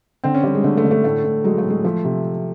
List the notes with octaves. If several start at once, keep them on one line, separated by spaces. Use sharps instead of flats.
D3 C4
C#4
G3
G#3
D3 A3
A3
D3
A3
A2 A3
A2
F#3 G#3
A3
A2
G#3
F3 A3
C3